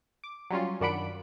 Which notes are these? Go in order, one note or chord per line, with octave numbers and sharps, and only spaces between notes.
D6
F#3 G3 C#4 F4
F#2 D#3 D4 F#5 B5 D7